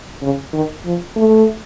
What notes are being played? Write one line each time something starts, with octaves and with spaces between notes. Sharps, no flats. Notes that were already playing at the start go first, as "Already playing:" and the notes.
C#3
D#3
F3
A3